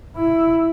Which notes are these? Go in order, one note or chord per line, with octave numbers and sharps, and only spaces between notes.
E4